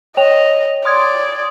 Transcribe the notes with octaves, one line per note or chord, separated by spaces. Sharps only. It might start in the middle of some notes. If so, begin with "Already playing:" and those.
C#5 D#5 G5 F7
D5 C6 D#6 G#6